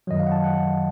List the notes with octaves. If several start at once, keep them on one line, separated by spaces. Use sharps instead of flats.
F#2 D#3 F#3 D#5
F5
F#5
A5
F#5